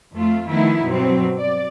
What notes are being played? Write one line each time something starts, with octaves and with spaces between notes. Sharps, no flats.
F2 A3 F4
D#3 F3 A3 B3 D#4 E4
G2 B2 F#3 C4
D5